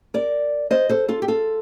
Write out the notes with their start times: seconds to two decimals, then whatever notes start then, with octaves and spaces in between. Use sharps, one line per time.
0.14 A#4 D5
0.71 C5 D#5
0.89 A4 C5
1.08 F4 A4
1.22 G4
1.28 F4 A4